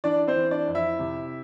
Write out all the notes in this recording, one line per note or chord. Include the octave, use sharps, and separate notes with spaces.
E3 D4 D5
C4 C5
E3
D4 D5
F2
E4 E5
C3